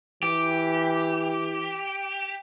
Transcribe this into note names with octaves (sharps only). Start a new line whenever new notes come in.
E3 G4